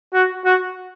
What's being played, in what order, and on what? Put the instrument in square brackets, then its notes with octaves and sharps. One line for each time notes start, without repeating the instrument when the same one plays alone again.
[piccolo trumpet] F#4
F#4